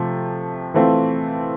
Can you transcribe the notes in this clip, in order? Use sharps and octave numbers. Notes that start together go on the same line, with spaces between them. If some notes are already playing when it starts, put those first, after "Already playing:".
Already playing: C3 F3 A3
E3 A3 C4 F4